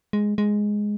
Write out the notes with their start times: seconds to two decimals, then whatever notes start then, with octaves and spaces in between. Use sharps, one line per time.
0.13 G#3
0.38 G#3